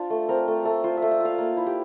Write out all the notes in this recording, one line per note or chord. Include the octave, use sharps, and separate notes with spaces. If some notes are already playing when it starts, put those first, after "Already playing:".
Already playing: D4 F4 C5
A3
C4 A#4
A3
A3
F4 C5
A3 E5
E5
F4 F5
A#3
E4
G4